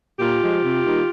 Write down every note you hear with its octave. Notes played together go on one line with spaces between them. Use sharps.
A#2 F4 G4
F3 G#3
C3
D#3 G3 A#3 D#4